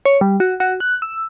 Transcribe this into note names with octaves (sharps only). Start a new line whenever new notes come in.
C#5
G3
F#4
F#4
F#6
E6